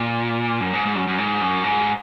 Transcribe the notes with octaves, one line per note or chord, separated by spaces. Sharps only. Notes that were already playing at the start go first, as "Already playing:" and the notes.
Already playing: A#2
F#2
G#2
G#2
F#2
F#2
G#2
F#2
G#2